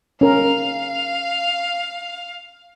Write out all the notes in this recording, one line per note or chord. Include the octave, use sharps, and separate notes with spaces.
C#4 A#4 F5